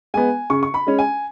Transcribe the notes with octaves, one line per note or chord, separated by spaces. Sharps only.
G#3 B3 G#5
C#3 C#6
C#6
B5
G#3 C#4
G#5